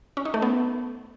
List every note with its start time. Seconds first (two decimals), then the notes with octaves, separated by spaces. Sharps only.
0.17 C#4
0.25 D#4
0.34 A3
0.42 B3